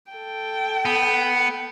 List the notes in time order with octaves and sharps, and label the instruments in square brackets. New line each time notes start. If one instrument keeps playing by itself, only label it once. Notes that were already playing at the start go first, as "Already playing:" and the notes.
[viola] A4 G5
[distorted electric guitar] B3